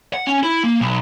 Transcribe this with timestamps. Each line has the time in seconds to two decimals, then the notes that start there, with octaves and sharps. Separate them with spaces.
0.14 F#5
0.27 C#4
0.43 E4
0.63 A#3
0.81 B1